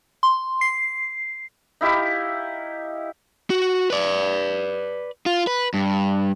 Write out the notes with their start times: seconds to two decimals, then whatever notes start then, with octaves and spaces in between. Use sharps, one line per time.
0.23 C6
0.61 C7
1.81 D#4 E4 G4 F5
3.50 F#4
3.90 B4 D5
5.26 F4
5.47 B4
5.74 G2